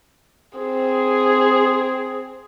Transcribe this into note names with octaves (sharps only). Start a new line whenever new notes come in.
C4 G#4